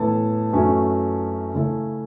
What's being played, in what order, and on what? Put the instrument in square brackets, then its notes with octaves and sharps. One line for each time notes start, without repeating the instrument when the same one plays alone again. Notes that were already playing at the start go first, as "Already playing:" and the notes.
Already playing: [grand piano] A2 E3 B3 E4 A4 [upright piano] A5
[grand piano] F#2 E3 A3 C#4
C#3 A3 C#4 E4 A4